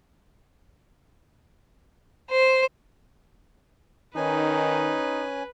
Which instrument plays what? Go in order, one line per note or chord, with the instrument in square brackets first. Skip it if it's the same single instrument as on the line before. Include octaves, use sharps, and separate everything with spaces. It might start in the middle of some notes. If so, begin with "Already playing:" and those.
[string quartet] C5
[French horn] D#3 [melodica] C#4 G#5 [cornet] D#4 [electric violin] B4